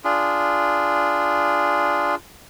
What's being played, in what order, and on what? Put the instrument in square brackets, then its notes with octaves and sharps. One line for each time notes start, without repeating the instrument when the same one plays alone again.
[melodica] D4 F4 G#4